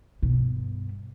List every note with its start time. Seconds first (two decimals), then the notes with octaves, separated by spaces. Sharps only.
0.22 G2 B2